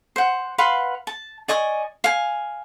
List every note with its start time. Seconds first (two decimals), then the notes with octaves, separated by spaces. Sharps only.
0.16 C5 F#5
0.58 B4 F5 F#5 C6
1.07 A5
1.48 D5 D#5 G#5 C#6
2.04 F5 G#5